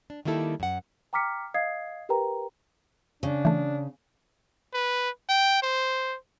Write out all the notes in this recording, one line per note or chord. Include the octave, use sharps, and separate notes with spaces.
D4
D#3 G3 A#3 E4 A4
F#2 F#5
G5 A#5 D6 F6 B6 C#7
D#5 F5 D#6 G#6 C7
G4 A#4 B4 G5 A#5
C#3 D4
E3 A3
B4
G5
C5